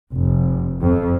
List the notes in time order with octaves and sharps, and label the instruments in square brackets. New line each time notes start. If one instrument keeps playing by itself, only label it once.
[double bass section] F1
F2